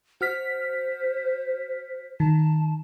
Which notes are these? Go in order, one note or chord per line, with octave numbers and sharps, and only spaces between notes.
F#4 C5 F6 B6
D#3 A5